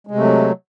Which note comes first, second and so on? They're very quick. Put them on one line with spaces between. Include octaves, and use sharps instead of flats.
G#3 C3 A3 F#3